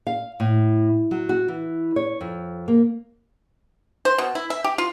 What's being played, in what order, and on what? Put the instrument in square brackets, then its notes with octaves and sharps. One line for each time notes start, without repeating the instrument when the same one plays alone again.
[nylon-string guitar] F5
A2
F#3
F#4
E3
C#5
F2
A#3
[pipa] C5
B2
E4
E5
G4
F4